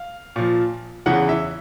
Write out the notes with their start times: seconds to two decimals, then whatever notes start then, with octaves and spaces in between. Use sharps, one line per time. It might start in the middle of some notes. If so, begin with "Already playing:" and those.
Already playing: F5
0.36 A#2 F3
1.06 E2 C#3 E3 F#5
1.29 E5